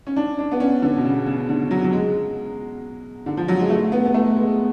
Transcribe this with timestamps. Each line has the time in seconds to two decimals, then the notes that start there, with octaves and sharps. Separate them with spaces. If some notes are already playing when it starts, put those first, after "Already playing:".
0.07 C#4
0.16 D4
0.39 D4
0.52 B3
0.60 C#4
0.82 D3
0.97 B2
1.04 C#3
1.26 C#3
1.49 D3
1.71 F#3
1.84 F#3
1.93 G#3
3.26 D3
3.37 F3
3.48 F#3
3.59 G#3
3.70 A3
3.92 B3
4.05 B3
4.14 A3
4.36 G#3